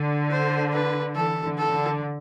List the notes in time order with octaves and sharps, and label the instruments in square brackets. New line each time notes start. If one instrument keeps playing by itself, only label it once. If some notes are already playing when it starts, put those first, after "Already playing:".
Already playing: [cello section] D3
[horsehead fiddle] C5
B4
[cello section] E3 [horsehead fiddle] A4
[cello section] D3
[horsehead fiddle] A4
[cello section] D3